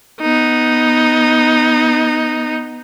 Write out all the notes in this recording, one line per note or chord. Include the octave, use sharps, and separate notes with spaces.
B3 D#4